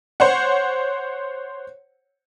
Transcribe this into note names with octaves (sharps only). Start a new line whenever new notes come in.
C5 C#5 F#5